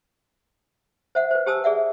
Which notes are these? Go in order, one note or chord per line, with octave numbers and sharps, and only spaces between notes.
C5 E5 F#5
B4 C5
G4 C5 G#5 A5 D#6 E6
G#4 D5 E5 F#5